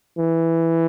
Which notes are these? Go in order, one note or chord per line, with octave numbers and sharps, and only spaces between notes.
E3